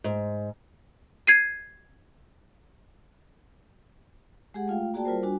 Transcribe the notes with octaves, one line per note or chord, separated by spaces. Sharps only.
G#2
G#6 C7 D#7
G#3 G4 G#4 F#5
A3 F4 F5 G5
A#3 F#4 G#4 D5 G5 A5
G3 F4 A#4 C5
G3 D4 F#4 G#5